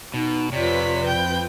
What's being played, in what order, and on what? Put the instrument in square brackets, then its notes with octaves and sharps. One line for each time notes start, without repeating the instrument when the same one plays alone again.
[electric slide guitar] B2 [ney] D#4
[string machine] F2 F4 B4 [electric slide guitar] C3 [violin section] C#5 B6 [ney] D5
[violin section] C4 G5 G6